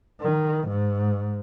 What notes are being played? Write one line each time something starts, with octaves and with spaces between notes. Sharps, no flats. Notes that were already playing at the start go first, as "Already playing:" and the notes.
D#3
G#2